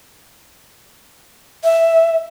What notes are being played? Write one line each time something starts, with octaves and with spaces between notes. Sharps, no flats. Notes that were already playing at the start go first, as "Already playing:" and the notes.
E5